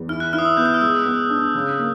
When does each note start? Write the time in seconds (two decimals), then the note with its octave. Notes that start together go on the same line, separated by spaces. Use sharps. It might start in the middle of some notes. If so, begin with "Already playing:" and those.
Already playing: E2
0.09 E4 F6
0.20 F#6
0.33 E4 F6
0.39 D#6
0.45 E6
0.57 B3 G6
0.66 F#6
0.74 F6
0.81 G#3 E6
1.06 B3
1.30 D4
1.55 C#3
1.79 A#3